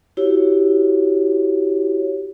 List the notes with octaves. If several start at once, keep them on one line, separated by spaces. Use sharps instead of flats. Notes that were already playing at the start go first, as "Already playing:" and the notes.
E4 F#4 G4 C#5